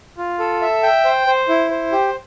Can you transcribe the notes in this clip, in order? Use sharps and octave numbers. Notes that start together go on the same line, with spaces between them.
F4
A4
E5
G5
C5
C5
E4
C5
G4